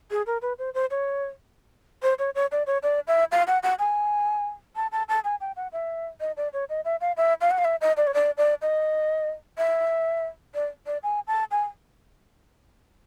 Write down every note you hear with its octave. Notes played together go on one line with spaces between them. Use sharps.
G#4
A#4
B4
C5
C5
C#5
C5
C#5
C#5
D5
C#5
D5
E5
F5
F#5
F#5
G#5
A5
A5
A5
G#5
G5
F#5
E5
D#5
D5
C#5
D#5
E5
F5
E5
F5
F#5
F5
E5
D#5
D5
C#5
D5
D5
D#5
E5
D5
D5
G#5
A5
G#5